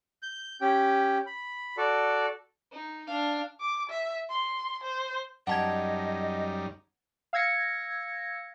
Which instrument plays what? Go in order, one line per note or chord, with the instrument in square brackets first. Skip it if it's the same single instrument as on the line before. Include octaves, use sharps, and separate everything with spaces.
[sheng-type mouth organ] G6
C#4 G4 G5
B5
F#4 A4 D5
[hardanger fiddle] D#4
D4 F5
[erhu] D6
E5
C6
C5
[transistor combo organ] F#2 G3 D#4 [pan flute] D#5 [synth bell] F#5 A5 G#6
[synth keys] F5 E6 G#6 A#6 C#7